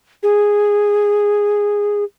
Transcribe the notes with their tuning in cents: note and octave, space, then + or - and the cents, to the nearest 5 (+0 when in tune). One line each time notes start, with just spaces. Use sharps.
G#4 -10